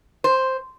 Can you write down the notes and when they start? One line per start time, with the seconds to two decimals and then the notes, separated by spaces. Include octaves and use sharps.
0.24 C5